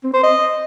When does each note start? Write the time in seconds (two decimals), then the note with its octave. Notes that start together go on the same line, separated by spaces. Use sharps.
0.03 C4
0.13 C5
0.23 D#5